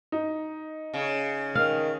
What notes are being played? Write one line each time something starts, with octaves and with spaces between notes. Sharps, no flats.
D#4
C#3
D#3 F5